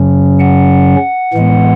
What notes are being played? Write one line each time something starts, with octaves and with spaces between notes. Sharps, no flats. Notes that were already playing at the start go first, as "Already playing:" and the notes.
Already playing: F#2 C#3 F#3 C#4
F#5
A2 E3 G#3 B3